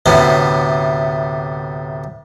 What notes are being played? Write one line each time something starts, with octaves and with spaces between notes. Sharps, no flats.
D2 A2 C3 B3 C#4